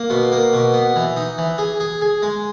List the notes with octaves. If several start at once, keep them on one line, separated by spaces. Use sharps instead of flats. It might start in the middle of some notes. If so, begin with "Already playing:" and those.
Already playing: A#3
B2
A#3
B2
B3
E3
D#4
E3
G#4
G#4
G#4
G#3